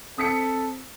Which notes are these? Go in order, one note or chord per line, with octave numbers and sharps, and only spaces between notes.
C4 A4 D#6 B6 C#7